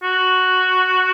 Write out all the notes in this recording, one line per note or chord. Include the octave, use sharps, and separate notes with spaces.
F#4